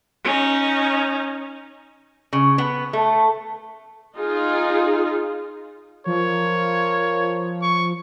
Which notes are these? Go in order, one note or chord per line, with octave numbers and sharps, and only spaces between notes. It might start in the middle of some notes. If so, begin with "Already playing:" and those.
C#4 D#4
C#3
B3
A3
D#4 F4 G#4
F3 F4 A#4 C#5
C#6